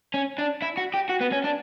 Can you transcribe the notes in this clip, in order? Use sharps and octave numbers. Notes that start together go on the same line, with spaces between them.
C#4
D4
E4
F#4
G4
F#4
B3
C#4
D4